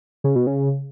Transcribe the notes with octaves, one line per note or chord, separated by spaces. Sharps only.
C#3
B2
C#3